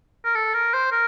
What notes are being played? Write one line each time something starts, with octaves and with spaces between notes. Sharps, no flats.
A#4
A4
A#4
C5
A#4